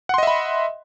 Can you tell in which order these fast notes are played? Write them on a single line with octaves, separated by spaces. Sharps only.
F#5 C6 D#5 E5 B5